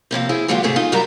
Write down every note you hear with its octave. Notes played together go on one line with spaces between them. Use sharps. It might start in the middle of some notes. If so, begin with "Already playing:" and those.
A2 C3 F3 A#3
E4 G#4 C5
D3 F#3 G#3 A#3 F4 G4
G#2 C3 A3 G#4
D#4 F4
G2 F#3 G3 D4 A#4 A#5